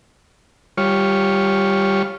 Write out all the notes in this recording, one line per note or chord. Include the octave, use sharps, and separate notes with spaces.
G3 F4 C#5